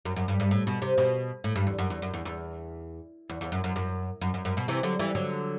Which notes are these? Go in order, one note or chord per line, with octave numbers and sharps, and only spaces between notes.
F#2
F#2
G2
G2
A2
B2
C3
B2
A2
G2
E2
F#2
E2
F#2
E2
E2
E2
E2
F#2
F#2
F#2
F#2
F#2
F#2
B2
C3 E3
D3 F#3
E3 G3
D3 F#3